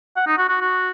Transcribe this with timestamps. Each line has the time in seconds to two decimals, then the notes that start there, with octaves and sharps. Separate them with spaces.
0.17 F#5
0.27 D#4
0.38 F#4
0.49 F#4
0.61 F#4